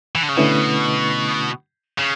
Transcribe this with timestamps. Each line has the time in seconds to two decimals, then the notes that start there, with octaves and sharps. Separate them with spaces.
0.15 E3
0.23 D3
0.29 C#3
0.37 B2 D3 A3 C#4 E4 B4
1.98 C#3